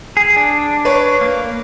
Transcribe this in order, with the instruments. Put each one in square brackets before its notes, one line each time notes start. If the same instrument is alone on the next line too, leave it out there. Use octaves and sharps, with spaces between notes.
[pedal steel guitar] G#4
D4
[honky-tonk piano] B4 C#5
[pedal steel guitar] A#3